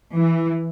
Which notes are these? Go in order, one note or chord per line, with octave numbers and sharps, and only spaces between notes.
E3